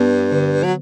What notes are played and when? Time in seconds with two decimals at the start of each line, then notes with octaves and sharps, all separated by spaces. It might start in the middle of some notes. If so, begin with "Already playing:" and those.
Already playing: G2 B3
0.32 D3
0.64 F#3